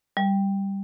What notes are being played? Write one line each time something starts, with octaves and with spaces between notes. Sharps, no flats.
G3